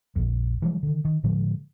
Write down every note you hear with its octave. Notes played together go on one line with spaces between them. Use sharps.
A#1 F2
E3 F3 G3 G#3
D3 D#3
D#3
A2 D3 F3 G#3